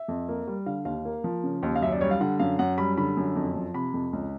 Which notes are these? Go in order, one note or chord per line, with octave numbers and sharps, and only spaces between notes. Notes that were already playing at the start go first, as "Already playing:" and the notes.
Already playing: E5
F2
A#3
G3
D3 F5
D#2 F5
A#3
F3
C#3
D#2
F5
F#2 E5
D5
G3 C#5
F5
D3 F#5
F#2 F5
F#2 F#5
G3 B5
D3 B5
F#2
F2
F3
C3 B5
F2
C#2